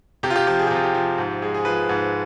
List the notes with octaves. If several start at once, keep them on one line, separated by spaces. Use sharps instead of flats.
C3 G4
F4
G4
F3 G4
G#4
G4
C3 F4
G4
F3
G#2
G#3
G#4
F3 B4
G#2